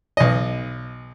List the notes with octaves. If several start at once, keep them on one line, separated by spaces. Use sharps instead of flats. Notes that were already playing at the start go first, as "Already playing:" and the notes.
B1 D#5